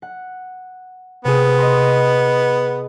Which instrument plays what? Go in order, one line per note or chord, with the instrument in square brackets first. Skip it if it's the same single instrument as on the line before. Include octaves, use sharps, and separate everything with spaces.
[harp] F#5
[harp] C3 G#4 [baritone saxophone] B3
[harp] D#5 B5 C6